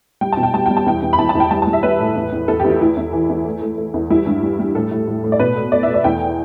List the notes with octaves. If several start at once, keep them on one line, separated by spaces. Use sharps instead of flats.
G3 G5
B2 A5
G5
G3 A5
G3 G5
A5
E2 G5
E2
B5
E2 A5
A5
E2
G5
G3 A5
A5
G3
E5
G3 B4
A2
E2
E2
E2 A4
G4
E2
E4
A3 E4
E2
E3
E2
A3
A3
A3
E2
G3 E4
G2
G3
G3
A2 A4
A2
A2
A2
D5
B2 B4
A3
A3 D5
E5
A3
D5
E2 G5